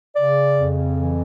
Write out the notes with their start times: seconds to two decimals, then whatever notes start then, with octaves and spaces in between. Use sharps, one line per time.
0.16 C#3 D5
0.58 F2
0.98 E3